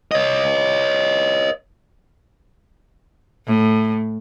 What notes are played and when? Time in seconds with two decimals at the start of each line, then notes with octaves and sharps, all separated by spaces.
0.11 C#5 D#5
3.46 A2